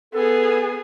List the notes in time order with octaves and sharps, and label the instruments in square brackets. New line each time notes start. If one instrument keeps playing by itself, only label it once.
[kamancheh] B3 G#4 [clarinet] A4